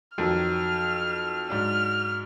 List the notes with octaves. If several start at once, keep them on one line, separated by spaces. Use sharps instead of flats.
F2 D#3 F#3 F6
G#2 F#3 D4 F6